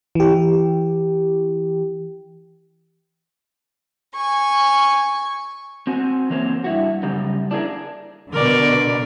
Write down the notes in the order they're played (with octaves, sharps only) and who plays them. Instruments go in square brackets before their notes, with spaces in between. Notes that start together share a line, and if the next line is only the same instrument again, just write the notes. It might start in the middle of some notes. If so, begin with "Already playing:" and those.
[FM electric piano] E3 G4
[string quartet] G#5 C#6
[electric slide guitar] C4 F#4 G#5
E3 F#3 A#3 C4
G2 E4 F#4
F#2 C#3 G3 D#4
D4 E4 G#4 A#4
[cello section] B2 D3 [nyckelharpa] A#4 D5